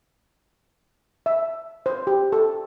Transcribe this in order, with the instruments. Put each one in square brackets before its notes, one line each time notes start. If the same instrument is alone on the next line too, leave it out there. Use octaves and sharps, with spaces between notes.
[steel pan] E5
C5
G4
A4